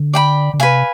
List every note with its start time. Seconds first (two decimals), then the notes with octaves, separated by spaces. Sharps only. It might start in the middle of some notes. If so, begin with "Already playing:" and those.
Already playing: D3
0.14 D5 G5 B5
0.54 D3
0.59 C3 B4 F5 G#5